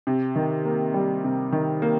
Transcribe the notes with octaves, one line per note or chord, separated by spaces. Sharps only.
C3
D#3
A#3
G3
C3
D#3
A#3